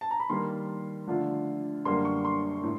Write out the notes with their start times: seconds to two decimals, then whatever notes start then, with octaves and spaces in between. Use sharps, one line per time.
0.01 A5
0.11 A#5
0.20 B5
0.29 D#3 G3 A#3 C6
1.07 D3 F3 A3 D4 F4
1.85 F#2 D3 G3 A#3 D4 C6
2.05 C#6
2.25 C6
2.63 A2